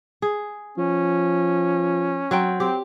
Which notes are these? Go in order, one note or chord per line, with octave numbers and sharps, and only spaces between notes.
G#4
F3 C#4
F#3 C4 G5
C4 G4